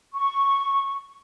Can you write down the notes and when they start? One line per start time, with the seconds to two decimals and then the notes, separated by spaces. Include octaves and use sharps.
0.14 C#6